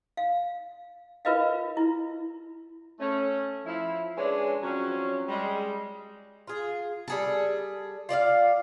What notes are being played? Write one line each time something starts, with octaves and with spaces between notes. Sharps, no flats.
F5
F4 A#4 B4 D#5 F5
E4
A3 C#4
F3 E4
D3 G#3 C#4 D4 B4 C#5
F3 F#3 C4 C#4
G3 G#3
F4 G#4
G3 G#4 A4
F4 D5 D#5 F5